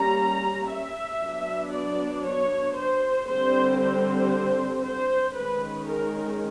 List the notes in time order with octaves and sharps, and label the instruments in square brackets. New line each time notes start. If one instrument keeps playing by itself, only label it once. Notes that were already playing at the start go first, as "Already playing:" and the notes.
Already playing: [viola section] G3 A#3 C#4 A#5
E5
F#3 B3 D4
D5
C#5
C5
D3 G3 C4 C5
C5
C5
D#3 G#3 C#4 B4
A#4